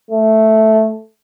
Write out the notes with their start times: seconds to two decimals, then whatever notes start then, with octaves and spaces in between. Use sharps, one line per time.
0.11 A3